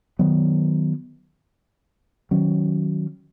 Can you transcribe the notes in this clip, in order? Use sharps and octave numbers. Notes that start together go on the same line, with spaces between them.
D#3 F#3 B3
D#3 F#3 C#4